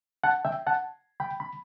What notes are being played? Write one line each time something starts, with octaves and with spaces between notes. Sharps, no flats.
F#5 A5
E5 G5
F#5 A5
G5 B5
B5